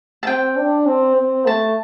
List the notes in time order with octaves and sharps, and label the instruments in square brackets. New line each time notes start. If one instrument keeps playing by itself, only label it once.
[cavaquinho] A5
[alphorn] C4 [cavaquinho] G5
[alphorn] D4
C4
C4
[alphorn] A3 [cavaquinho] A5